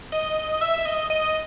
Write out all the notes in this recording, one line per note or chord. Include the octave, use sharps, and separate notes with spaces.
D#5
E5
D#5
D#5